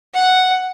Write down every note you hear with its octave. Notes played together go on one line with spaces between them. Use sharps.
F#5